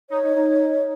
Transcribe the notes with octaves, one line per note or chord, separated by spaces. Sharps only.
D#4 C#5
D#4
D#4